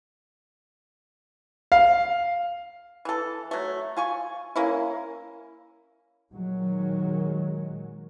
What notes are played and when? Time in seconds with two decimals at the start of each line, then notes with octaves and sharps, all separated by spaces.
1.72 F5
3.05 E3 A4
3.51 F#3 A3
3.97 F4 G#5 C#6
4.56 A#3 C#4 E4
6.32 A#2 D#3 F#3 G#3